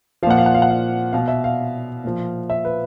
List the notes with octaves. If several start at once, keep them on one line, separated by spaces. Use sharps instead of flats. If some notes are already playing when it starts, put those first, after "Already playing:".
A#2 F3 F5 F#5
F5
F#5
F5
F#5
F5
B2 F5
E5
F5
A#2 F3
E5
B4